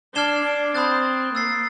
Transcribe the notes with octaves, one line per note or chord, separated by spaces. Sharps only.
D4 F6 G#6 C7 E7 G7
D4
C4 B5 D#6 F#6 A6
A#3 E6 A6 C7